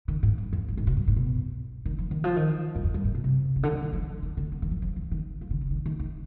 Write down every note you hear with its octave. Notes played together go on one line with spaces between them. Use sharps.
D#3
G#2
G2
F2
G2
G#2
B2
G2
G#2
B2
D#3
F3
D#3
F3
D#3
G2
F2
G2
G2
B2
C3
C3
D3
F3
D#3
F3
D#3
D#3
D3
D#3
D#3
F3
F3
F3
D#3
F3
D3
D3
D#3
D#3
D#3